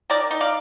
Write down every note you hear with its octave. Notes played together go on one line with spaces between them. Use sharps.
D#3 A#4 D5
D#4
D5 F5